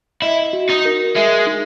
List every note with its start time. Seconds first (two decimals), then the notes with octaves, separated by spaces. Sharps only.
0.22 E4 D#5
0.53 F#4
0.69 D#4
0.85 A#4
1.16 G#3 E5
1.47 D#4